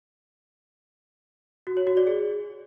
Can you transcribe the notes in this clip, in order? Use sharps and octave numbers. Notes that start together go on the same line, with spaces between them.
F#4
C#5
F#4
D5
G#4